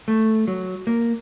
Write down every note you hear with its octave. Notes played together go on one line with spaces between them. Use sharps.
A3
F#3
A#3